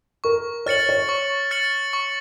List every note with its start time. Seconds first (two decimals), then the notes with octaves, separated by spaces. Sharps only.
0.24 A#4 C#6
0.66 C#5 F6 A6 C#7 F#7
0.89 C#5
1.09 C#6
1.51 F6 A6 C#7 F#7
1.93 C#6